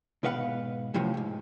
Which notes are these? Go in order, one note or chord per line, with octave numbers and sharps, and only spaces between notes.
G#2 B2 B4 F5 F#5
F#2 A2 C3 F3 F#3
B1 G#2